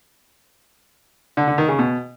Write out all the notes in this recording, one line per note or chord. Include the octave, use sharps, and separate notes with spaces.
D3
D3
D#3
C#3
B2